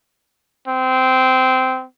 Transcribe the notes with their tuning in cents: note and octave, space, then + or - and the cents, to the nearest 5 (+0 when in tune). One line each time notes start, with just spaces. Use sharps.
C4 -15